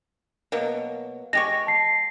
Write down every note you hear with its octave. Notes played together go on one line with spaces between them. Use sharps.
B2 F#3 A#3
G#3 G4 C#6 A#6
A5 C7